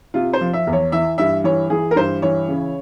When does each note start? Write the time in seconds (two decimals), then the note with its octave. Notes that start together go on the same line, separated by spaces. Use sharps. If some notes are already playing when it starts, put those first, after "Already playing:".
0.14 C3 F4
0.33 C5
0.41 F3
0.53 E5
0.67 E2
0.73 C#5
0.92 E3 E5
1.18 G2 E5
1.44 E3 C#5
1.70 E3 G#4
1.91 A#4
1.96 G2 C5
2.22 E3 C#5
2.48 C#3